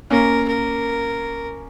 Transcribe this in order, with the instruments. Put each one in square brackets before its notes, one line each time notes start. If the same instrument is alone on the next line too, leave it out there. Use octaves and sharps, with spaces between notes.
[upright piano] A#3 C#4 [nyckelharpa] A#4
[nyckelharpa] A#4